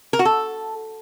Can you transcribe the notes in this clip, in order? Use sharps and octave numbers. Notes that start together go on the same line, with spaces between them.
A#4
F#4
A4